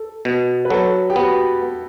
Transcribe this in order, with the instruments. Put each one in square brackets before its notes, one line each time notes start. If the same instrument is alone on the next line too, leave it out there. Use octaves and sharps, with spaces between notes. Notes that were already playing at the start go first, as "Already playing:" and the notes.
Already playing: [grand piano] A4
[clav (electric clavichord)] B2
[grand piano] B4
[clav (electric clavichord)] F#3 [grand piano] A4
[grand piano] G4
[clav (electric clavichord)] B3 [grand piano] F#4